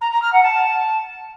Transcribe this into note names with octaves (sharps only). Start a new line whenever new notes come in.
A#5
A#5
F6
F#5
A5